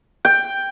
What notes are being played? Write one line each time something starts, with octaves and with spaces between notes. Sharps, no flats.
G5